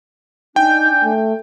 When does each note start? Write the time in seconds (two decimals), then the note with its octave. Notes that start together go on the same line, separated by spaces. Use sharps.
0.56 D4 D#4 G5 G#5 G6
1.03 A3